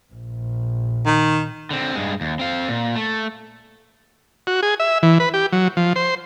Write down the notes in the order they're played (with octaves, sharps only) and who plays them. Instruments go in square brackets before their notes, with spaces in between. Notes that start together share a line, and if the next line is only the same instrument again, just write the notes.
[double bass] A#1
[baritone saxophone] D#3
[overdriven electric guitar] D3 C4
G2 G#3
D#2
C4 F5
A#2
A3
[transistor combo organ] F#4
G#4
E5
E3
B4
G4
F#3
F3
C5